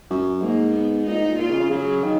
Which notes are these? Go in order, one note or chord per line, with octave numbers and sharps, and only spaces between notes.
F#2
G#2 A#3
B3
A#2 D#4
G#2
A#2
A#2 F4
C#3
C#3
C#3 F#3
D#3